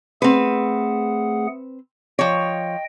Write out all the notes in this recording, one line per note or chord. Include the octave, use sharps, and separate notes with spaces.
A3 C4 G#4 B4 F#5
F3 C#5 D#5 G5